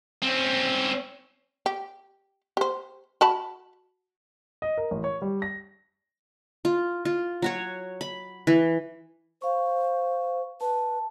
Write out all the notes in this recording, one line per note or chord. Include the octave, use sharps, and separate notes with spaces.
C4 C#4
G4
G4 C5
F#4 A5 B5
D#5
A#4
A1
C#5
G3
A#6
F4
F4
F#3 F#4 C#5
B5
E3
C5 F5 C#6
B4 A5